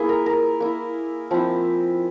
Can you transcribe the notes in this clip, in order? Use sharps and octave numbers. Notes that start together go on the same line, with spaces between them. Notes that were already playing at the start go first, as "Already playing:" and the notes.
Already playing: A#3 E4 G#4
A#4
A#4
A#3 E4
F3 C4 E4